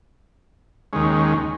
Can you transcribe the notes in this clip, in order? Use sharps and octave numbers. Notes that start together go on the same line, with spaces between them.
D#2 D#3 G#3 C#4